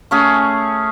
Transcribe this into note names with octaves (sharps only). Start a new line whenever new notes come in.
A3 C#4 G#4